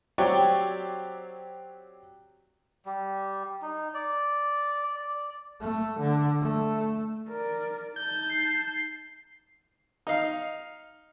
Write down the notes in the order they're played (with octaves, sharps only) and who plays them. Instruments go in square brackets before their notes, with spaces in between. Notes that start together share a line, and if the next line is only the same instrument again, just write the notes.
[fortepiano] F#3 C4 G4 C#5 D5 G5
[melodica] G3
D#4
D5
D5
[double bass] A3
D3
A3
[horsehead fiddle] A#4 D5
[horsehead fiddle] D#4 A5 [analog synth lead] G6
[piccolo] C7
[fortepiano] D#4 F5